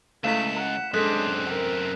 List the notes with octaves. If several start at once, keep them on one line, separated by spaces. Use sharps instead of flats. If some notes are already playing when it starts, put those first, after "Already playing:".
C#2 A3 E4 C5 F5 B6 E7
F#5 A#5
F#2 G#3 C4 D4 A4 F#6 B6
A#4 G5